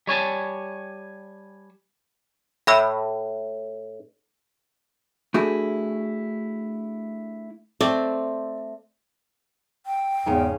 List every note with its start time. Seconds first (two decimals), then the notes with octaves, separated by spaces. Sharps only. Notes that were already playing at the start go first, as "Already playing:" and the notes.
0.07 G3 C#5 G#5 A5
2.67 A2 E5 B5 E6
5.34 A3 D4 E4 F#4 G#4
7.81 A3 C4 D5
9.86 G5
10.26 E2 G#2 C#3 C#4